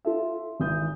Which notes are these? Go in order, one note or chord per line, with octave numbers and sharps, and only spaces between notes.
F4 A4 E5
G#1 E3 D#6 G6